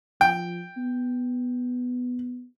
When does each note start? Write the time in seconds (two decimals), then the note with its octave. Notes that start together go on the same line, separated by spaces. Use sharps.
0.21 F3 G5
0.77 B3